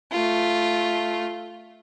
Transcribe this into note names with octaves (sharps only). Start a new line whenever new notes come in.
A3 F4